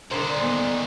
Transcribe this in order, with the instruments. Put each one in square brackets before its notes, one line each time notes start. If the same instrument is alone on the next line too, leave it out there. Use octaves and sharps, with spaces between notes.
[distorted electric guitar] A#2 D#3 [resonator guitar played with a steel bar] D3 C5 [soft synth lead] A#4
[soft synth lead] D5
[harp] B3 D#4 G#5